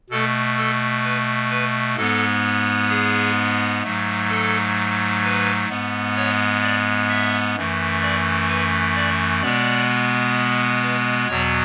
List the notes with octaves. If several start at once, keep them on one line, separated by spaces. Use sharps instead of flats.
B2 A3 A4
A4
B4
B4
G#2 G#3 B3 A4
G#4
G#2 F#3 A3
A4
B4
G#2 G#3 B3
C#5
D5
E5
F#2 E3 A3
D5
B4
D5
B2 G#3 B3 D5
B4
E2 B2 F#3 B3 C#5